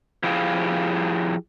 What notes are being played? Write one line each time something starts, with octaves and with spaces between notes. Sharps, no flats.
F3 E4 G4 G#4 F5